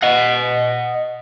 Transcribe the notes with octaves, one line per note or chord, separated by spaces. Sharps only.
D#5 F#5